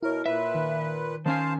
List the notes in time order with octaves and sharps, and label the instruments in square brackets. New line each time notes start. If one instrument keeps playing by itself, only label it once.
[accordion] B2 A#4 [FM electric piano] E4 C#5
[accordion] A#2 B4 [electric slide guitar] E5
[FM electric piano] D#3
[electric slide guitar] D#3 C#4 G#5 [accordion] C5 F5 A5